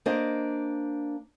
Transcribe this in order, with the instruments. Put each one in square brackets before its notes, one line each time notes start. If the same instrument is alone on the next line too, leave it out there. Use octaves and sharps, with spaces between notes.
[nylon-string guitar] A#3 D4 C5 D#5